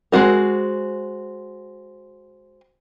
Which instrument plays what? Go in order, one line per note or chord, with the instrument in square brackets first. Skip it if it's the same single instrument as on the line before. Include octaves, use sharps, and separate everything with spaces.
[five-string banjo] G#3 C4 F#4 A#4